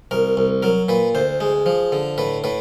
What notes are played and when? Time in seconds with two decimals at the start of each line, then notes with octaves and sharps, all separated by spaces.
0.11 C2 A#4
0.37 C2
0.63 F#3 A#4
0.89 A#2 B4
1.15 D2 C5
1.41 G#3
1.66 F3
1.92 D3
2.18 A2 B4
2.44 A2 B4